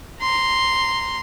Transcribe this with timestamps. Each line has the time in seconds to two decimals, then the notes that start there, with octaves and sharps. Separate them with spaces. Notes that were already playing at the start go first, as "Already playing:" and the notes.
0.21 A#5 C6